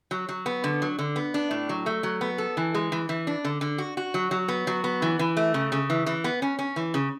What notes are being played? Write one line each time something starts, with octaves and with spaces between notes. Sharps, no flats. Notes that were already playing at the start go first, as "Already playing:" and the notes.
F#3
F#3
B3
D3
F#3
D3
B3
D4
A2
F#3
A3
F#3
B3
A4
E3
G#3
E3
E3
D4
D3
D3
F#4
F#4
F#3
F#3
B3
F#3
B3
E3
E3
A3
C#3
C#3
E3
E3
B3
C#4
C#4
E3
C#3